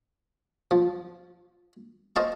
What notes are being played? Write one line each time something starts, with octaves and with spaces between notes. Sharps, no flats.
F3
C5 D#5 F5 A5 C#6